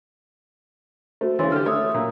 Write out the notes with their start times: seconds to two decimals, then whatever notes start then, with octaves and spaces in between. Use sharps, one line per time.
1.21 A3 F#4 C5
1.39 C#3 E3 C#5 C6 A6
1.52 D3 G4 F6
1.66 A3 C#5 E5 D#6 E6
1.94 A#2